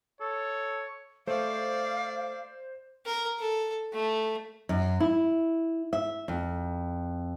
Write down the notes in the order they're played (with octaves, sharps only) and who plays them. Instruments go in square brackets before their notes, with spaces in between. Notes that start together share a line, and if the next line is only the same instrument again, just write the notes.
[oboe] A4 [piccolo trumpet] C#5
[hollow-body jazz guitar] A3 [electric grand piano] C5 [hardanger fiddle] D5 [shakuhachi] F5
[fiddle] A#4
A4
A3
[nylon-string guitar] F#2
E4
E5
F2